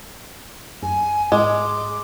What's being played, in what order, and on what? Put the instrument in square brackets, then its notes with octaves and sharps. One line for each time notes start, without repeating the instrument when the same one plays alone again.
[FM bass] F#2 [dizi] G#5
[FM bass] G#2 [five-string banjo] G#3 [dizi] D6